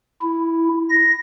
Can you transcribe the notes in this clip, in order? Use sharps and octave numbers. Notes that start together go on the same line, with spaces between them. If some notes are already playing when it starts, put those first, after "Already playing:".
E4
A#6